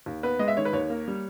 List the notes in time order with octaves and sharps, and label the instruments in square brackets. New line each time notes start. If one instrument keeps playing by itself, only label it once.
[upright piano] D#2
B3 B4
G#3 D#5
E5
D#3 C#5
B4
D#2 C#5
A#3
G3